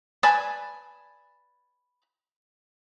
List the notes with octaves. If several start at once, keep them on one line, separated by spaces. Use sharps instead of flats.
B4 D5 G#5 A5